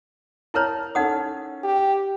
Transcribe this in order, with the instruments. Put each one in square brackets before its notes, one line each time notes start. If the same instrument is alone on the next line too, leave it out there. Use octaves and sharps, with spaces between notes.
[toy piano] E4 A#4 C#5 [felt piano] A5 A#5 F6
[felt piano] C#4 A4 [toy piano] D#4 F#5 D#6
[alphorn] G4